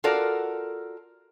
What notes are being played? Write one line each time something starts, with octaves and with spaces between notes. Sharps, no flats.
F4 F#4 A4 A#4 D5